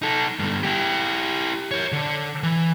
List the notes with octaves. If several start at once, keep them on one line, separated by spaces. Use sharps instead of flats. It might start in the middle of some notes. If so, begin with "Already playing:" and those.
D#4 A4
G2 D3
E4 G4
A#4 C#5
D3
E3